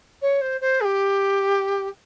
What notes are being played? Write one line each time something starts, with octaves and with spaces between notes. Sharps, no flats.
C#5
C5
C5
G#4
G4